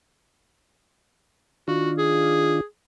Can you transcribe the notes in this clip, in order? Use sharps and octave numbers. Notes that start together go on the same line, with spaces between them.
D#3 D4 F4 F#4
G#4